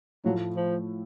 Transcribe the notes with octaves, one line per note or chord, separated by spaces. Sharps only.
A2 F3 F#3 A3
F3